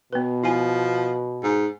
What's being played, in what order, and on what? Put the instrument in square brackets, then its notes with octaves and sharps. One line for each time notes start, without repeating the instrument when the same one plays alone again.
[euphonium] B2 [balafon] B3 B4
[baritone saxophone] F3 [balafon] E4 G#5
[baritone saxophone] G#2